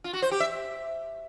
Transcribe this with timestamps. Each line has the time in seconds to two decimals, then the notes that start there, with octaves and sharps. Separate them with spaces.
0.04 F4
0.13 F#4
0.22 C5
0.31 G4
0.40 E5